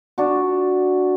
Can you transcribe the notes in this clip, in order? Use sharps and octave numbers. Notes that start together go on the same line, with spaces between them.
D4 F#4